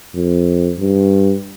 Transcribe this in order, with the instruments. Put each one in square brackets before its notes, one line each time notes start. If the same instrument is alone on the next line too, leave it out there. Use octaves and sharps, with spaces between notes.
[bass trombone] F2
G2